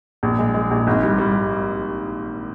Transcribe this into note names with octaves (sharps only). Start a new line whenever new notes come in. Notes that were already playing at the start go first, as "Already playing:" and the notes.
A#1
G#3
G#3
A#1
G#1
G3
G3